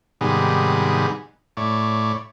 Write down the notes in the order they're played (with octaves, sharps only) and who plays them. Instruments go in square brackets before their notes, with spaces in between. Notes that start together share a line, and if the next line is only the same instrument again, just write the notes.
[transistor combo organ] G#2 C3 D#3 G3 B3 G#4
A2 C#5 D5